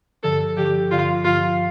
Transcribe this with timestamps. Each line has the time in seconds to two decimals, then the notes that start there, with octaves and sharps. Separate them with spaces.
0.23 G2 D3 F3 A4
0.57 G2 D3 F3 G4
0.90 G2 D3 F3 F4
1.24 G2 D3 F3 F4